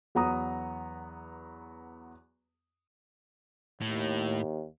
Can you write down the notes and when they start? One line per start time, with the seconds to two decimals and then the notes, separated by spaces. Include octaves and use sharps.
0.15 E2 F#3 B3 A#5 D#6
3.82 D#2 A2